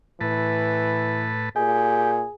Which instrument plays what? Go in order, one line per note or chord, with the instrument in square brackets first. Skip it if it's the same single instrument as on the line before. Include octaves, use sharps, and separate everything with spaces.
[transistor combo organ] A2 B4 A5 [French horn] E3
[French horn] A#2 [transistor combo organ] G4 [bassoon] G#4